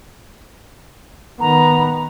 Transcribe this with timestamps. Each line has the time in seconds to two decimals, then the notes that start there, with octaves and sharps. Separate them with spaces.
1.40 D#3 B3 A#5